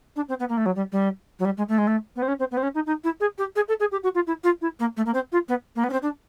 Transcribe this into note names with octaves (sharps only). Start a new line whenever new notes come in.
D4
C4
B3
A#3
A3
F#3
G3
G3
F#3
G3
G#3
A3
G#3
A3
B3
C4
C#4
C4
B3
C4
C#4
D#4
D#4
E4
G#4
G4
G#4
A4
G#4
G4
F#4
F4
E4
F4
E4
A#3
A3
A#3
C4
F4
B3
A#3
B3
C#4
C4
D4